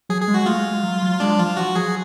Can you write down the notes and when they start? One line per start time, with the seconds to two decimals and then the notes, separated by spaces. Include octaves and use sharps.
0.09 F#3 G#4
0.22 G#4
0.28 G#3
0.34 F#4
0.46 A3 F4
0.58 G#3
0.71 G#3
0.83 F#3
1.02 F#3
1.20 G#3 D4
1.39 F3 F4
1.57 F3 F#4
1.75 F#3 G#4